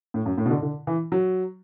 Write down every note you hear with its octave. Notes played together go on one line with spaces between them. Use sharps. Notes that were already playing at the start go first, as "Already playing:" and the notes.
A2
F#2
A2
B2
D3
D3
E3
F#3